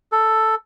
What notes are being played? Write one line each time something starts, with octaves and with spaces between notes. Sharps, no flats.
A4